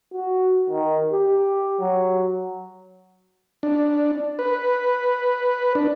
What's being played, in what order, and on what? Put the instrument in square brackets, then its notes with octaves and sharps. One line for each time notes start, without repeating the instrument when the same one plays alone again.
[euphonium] F#4
D#3
G4
F#3
[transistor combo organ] D4
B4
D4